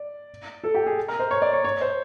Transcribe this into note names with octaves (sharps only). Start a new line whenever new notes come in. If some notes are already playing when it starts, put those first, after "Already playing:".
Already playing: D5
A4
G4
G#4
A#4
C5
C#5
D5
C#5
C#5
C5